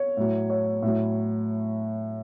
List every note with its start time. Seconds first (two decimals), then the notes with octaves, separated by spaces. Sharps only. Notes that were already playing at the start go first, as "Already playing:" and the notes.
Already playing: C#5
0.17 A2 F#3
0.50 C#5
0.82 A2 F#3